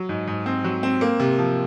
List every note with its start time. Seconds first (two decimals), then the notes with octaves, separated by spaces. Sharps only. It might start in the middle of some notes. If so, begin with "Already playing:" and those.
Already playing: F#3
0.09 G#2
0.27 G#2
0.46 C4
0.64 F#3
0.83 C4
1.01 A#3
1.20 C3
1.38 F3